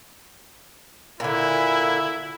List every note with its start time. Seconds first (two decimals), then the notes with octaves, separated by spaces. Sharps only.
1.20 A#2 D3 E4